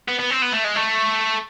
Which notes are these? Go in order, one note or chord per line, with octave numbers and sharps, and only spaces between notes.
B3
B3
C4
B3
A3
G#3
A3